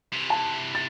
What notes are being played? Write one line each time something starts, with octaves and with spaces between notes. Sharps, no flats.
C3 E3
A5
A6